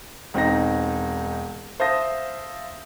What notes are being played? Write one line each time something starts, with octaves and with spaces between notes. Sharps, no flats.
E1 C4 D#4 A#6
C5 E5 F5 A5 D#6 A#6